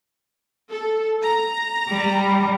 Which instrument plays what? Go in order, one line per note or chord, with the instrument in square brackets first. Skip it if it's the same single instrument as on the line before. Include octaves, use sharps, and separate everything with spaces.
[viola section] A4
A#5
[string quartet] G3